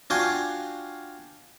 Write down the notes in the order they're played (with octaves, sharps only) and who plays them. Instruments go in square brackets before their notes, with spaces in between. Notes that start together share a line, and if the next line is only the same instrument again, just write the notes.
[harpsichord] D4 F4 F#4 G5 G#5 C6